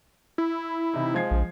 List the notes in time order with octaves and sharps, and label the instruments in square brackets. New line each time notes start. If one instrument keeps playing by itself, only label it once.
[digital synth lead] E4
[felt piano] C3 E3 D#4
[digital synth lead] F3 [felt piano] G#3 G#6 C7
[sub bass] A#1